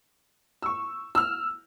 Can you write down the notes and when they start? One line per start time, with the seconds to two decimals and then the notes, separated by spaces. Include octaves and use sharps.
0.62 C#6 E6
1.15 E6 F6